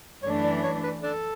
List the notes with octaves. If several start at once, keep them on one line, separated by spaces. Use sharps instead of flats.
F#2 E3 A3 D4 C#5
D5
C#5
B4
D4 A4